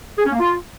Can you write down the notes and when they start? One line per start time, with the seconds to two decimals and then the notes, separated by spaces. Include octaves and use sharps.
0.19 G#4
0.26 C#4
0.32 A#3
0.39 F4